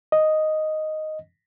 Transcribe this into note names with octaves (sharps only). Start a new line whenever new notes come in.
D#5